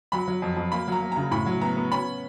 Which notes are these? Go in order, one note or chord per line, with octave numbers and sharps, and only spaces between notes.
F#3 B5
F#3
F2
F2
A#3 B5
F#3 A#5
A#3
C#3 A#5
A2 B5
F#3
B3 A#5
B3
C#4 B5